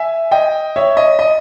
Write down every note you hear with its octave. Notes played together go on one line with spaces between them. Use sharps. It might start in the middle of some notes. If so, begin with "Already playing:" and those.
Already playing: E5 G#5
D#5 G5
C#5 E5
D#5
D#5